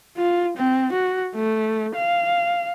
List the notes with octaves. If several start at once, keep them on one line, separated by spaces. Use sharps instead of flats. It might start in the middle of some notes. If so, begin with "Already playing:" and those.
F4
C4
F#4
A3
F5